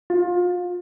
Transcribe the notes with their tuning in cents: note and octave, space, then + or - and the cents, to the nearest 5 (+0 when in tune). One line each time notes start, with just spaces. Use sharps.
F4 +25